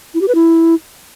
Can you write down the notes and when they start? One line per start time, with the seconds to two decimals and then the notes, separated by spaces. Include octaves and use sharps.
0.14 E4
0.21 G4
0.28 B4
0.35 E4